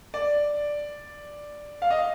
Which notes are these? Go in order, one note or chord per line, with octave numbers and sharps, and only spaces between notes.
D5
F5
D#5
F5